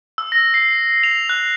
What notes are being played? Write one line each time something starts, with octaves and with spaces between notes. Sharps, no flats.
E6
A#6
C7
F7
F#6